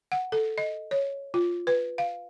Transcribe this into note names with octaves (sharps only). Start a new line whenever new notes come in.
F#5
A4
D#5
C#5
F4
B4
F5